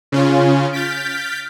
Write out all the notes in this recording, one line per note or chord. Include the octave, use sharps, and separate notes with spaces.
C#3 C#4 F4
F6 G6 A6 B6 D7